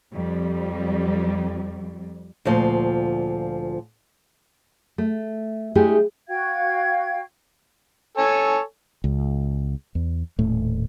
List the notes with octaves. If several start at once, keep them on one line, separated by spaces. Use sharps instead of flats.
F2 G3
D2 A#2 F3
A3
G#3 A3 D4 E4 G4 G#4
F#4 F5 G5 G#6
A4 C#5 G#5
C#2
E2
D#1 A2 A3